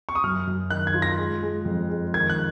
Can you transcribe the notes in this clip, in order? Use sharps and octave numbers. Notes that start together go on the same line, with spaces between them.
C#6
D#6
F#2 F6
F#2
D#3 F#6
G#6
F4
A#6
G#3
G#3
F2
G#3
D#3 G#6
F#6